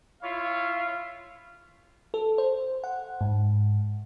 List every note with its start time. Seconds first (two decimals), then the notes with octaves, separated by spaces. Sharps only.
0.22 E4 F4 C#5 F5
2.14 A4
2.38 C5
2.84 F#5
3.21 G#2